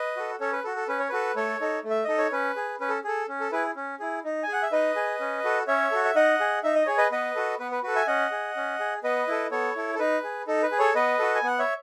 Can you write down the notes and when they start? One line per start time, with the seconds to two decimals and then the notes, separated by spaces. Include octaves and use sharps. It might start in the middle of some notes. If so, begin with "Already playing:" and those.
Already playing: B4 D#5
0.17 F#4 A4
0.40 C#4 A4 C#5
0.52 B4
0.64 F#4 A4
0.76 A4
0.88 C#4 B4
0.99 C#5
1.09 F#4 A4 B4
1.36 A3 A4 C#5
1.61 D#4 A4
1.84 A3
1.90 E5
2.04 D#4 A4 D#5
2.18 C#5
2.32 C#4 B4
2.56 G#4
2.80 C#4 B4
2.89 A4
3.04 G#4 A4
3.28 C#4
3.40 A4
3.52 E4 G#4 B4
3.76 C#4
4.00 E4 G#4
4.24 D#4
4.43 G#5
4.48 G#4 F#5
4.63 E5
4.72 D#4 B4 D#5
4.96 G#4
5.20 C#4
5.44 F#4 A4
5.67 C#4 C#5 E5
5.91 F#4 A4
6.05 E5
6.16 D#4 D#5 F#5
6.40 G#4
6.64 D#4 E5
6.75 D#5
6.86 G#4 C#5
6.98 B4 D#5
7.12 B3 B4 D#5
7.35 F#4 A4
7.59 B3 B4
7.71 B4
7.83 F#4 A4 B4
7.96 E5 G#5
8.07 C#4 D#5 F#5
8.31 G#4
8.56 C#4
8.80 G#4
9.04 B3 B4 D#5
9.28 E4 A4
9.51 B3 A4 C#5
9.76 E4 A4
9.95 A4
9.99 D#4 B4
10.23 G#4
10.47 D#4 A4
10.63 B4
10.71 G#4
10.79 A4 C#5
10.95 B3 B4 D#5
11.19 F#4 A4
11.35 G#5
11.43 B3 F#5
11.59 C#5 E5